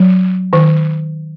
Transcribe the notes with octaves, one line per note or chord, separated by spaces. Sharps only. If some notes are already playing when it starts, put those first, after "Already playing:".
Already playing: F#3
D#3